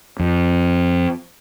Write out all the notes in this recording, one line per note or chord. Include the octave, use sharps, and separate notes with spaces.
F2